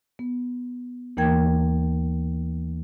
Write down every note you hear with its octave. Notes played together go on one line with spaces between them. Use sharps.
B3
D#2 E3 A#3 A#4 G5 G#6